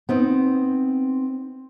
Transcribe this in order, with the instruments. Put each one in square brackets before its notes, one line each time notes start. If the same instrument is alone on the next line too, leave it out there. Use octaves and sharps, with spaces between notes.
[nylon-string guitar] B3 C4 D#4